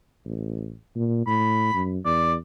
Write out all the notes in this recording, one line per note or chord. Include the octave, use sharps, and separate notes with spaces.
A1
A#2
A2 B5
F#2
E2 D5